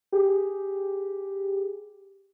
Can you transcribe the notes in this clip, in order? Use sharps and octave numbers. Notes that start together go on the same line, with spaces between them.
G4 G#4